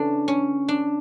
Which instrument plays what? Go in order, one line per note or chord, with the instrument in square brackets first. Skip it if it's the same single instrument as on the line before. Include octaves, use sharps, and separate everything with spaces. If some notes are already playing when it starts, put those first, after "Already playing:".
Already playing: [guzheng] C#3 E3 A3 C#4 D4
C#4
D4